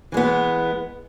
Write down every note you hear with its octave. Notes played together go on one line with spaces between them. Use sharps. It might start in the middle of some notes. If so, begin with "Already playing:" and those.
E3 G#3 B3